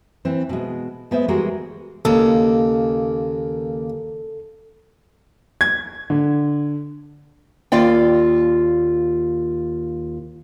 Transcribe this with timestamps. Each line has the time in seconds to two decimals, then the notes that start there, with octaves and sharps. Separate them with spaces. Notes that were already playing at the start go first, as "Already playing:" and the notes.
0.25 E3 C4
0.49 B2 G#3
1.11 G#3 B3 C5 E5
1.28 E3 G3 G#3 F#4 G#4 A#4
2.05 D#2 C#3 A#3 A4
5.61 G#6
6.10 D3
7.72 D#2 F4 D5 G5